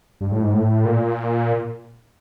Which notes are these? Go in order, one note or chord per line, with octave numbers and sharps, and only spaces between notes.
G2
A2
G#2
A2
A#2